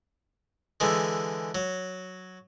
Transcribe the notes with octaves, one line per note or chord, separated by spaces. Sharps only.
D3 E3 G#3
F#3